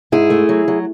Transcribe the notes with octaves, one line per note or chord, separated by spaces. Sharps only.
G#2 E4 G#4
A3
F#3
F#3